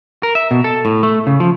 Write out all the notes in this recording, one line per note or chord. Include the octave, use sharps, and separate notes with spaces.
A#4
E5
B2
A4
A2
A3
C#3
F3